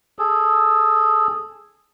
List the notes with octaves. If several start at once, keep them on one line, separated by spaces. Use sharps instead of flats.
G#4 A4